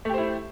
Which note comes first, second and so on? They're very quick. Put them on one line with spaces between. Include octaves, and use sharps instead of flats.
A3 G4 C5 E4